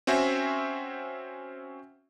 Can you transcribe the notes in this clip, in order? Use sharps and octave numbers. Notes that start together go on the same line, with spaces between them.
C4 C#4 F#4 C5 E5 G#5